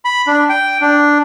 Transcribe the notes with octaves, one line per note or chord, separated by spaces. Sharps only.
B5
D4
G5
D4